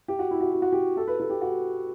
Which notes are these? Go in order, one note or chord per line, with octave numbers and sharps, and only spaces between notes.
G4
F#4
E4
F#4
G4
F#4
G4
A4
B4
A4
G4
F#4